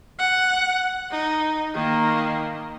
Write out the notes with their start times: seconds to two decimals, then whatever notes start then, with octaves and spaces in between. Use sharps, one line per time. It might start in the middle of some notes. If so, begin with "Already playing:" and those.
0.19 F#5
1.11 D#4
1.75 D#3 A#3